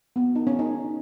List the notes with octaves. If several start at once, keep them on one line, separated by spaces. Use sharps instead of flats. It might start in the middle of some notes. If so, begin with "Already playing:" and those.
B3
D#4
C#4
D#4